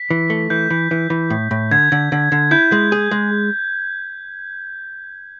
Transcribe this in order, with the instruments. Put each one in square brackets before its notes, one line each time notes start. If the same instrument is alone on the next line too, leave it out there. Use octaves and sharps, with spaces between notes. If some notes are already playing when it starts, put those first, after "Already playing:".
Already playing: [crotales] B6
[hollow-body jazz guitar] E3
A3
[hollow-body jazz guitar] E3 [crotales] G6
[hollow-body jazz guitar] E3
E3
E3
A2
A2
[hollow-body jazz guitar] D3 [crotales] G#6
[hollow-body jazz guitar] D3
D3
D3
[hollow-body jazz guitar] E4 [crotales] G6
[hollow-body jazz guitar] G#3
G#4
G#3